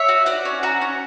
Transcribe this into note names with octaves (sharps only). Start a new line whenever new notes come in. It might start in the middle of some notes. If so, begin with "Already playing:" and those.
Already playing: C#5 E5
F#4
F#4 D5 F#5
C#4
F#4 F#5 A#5
C#4